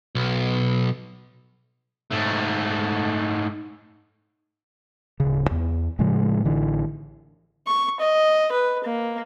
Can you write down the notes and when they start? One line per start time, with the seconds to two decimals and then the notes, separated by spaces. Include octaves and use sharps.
0.15 B1
2.11 G#2 A3
5.20 D1 C#3
5.51 E2
5.99 A2 C#3 F3 G#3
6.45 A1 D3 E3
7.67 C#6
8.00 D#5
8.52 B4
8.84 A#3